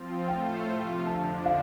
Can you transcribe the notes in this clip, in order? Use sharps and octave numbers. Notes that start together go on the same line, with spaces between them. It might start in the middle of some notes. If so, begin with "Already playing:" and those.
Already playing: F3 C4 F4
A2 A3 F4 A4 C5 G5
C3 F3 A3 F4
F2 D3 F3 D4 A5
F5